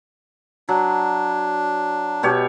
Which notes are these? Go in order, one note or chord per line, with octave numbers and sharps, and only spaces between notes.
F#3 D4
B2 G4 C#5